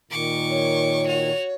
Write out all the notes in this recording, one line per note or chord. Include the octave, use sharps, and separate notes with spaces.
A#2 D#3 C#6 D6
C#5
F#4 F7